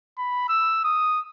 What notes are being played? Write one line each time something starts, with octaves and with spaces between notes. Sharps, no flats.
B5
E6
D#6